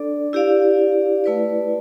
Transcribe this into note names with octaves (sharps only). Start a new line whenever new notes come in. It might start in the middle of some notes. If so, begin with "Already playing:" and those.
Already playing: D4 A4 D5
E4 G4 D5 F5
A3 E4 B4 D5